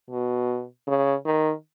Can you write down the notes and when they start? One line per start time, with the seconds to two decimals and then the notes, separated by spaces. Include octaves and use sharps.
0.10 B2
0.87 C#3
1.26 D#3